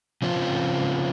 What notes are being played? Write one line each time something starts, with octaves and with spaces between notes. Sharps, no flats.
C#3 F3 C4 C#4 F4